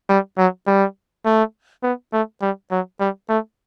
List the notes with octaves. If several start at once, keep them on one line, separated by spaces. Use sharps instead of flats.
G3
F#3
G3
A3
B3
A3
G3
F#3
G3
A3